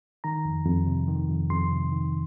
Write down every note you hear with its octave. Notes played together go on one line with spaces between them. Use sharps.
D#3 A#5
F2
F2
C3
D#3
F2
F2 C6
C3
D#3